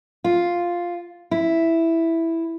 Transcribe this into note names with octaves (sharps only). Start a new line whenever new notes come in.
F4
E4